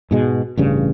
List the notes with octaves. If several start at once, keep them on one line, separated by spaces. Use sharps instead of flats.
G#2 B2 G#3
A1 G2 C#3